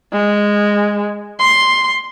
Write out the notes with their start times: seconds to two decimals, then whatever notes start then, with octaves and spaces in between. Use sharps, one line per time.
0.13 G#3
1.39 C6